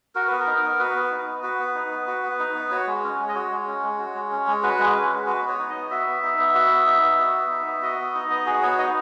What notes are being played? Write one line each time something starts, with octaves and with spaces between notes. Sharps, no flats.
F#4 A#4
B3 B4
A#4
D#4
B3
F#4 B4
B3
D#4
B3
F#4 B4
B3
D#4
B3
F#4
B3
D#4
B3
F#4 C#5
G#3
C#4
G#3
D#5
F#4 C#5
G#3
C#4
G#3
F#4
G#3
C#4
G#3
F#4 B4
G#3
C#4
G#3
F#4 B4
B3
C#5
D#4
B3 D#5
F#4 E5
B3
D#4
B3
F#4
B3
D#4
B3
F#4
B3
D#4
B3
F#4 D#5
B3
D#4
B3
F#4 G#4
B3 C#5
D#4 D#5